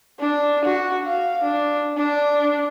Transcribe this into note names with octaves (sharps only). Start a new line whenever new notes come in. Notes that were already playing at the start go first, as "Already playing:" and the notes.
D4
F#4
F5
D4
D4